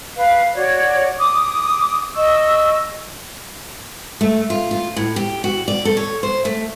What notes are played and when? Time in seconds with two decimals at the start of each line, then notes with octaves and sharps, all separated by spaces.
0.17 B4 F5
0.54 F#4 C#5 D5
1.20 D6 D#6
2.15 D#5 C#6 E6
4.21 A3
4.50 F4
4.71 F4
4.96 A2
5.16 G4
5.44 F#4
5.68 D5
5.85 A4
5.97 C#5
6.23 C5
6.45 A3